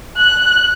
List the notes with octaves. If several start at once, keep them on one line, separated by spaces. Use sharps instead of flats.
F#6